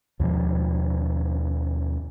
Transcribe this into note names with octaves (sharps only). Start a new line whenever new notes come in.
D#2 G#2 B2 F3